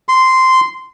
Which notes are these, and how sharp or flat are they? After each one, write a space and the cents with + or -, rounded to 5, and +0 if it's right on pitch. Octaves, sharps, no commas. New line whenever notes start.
C6 -10